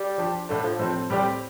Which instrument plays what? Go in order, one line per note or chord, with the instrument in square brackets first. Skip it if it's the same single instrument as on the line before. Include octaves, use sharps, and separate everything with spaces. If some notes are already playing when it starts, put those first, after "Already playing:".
Already playing: [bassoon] G3
[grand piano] F3 D4 G4
[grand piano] A2 A3 D4 [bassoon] D3
[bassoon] F3
[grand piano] A2 F3 C4 A4
A2 G3 C4 G4 D5